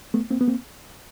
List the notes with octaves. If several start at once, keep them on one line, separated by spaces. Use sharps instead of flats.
A3 B3
A#3 C4
B3
A#3 C4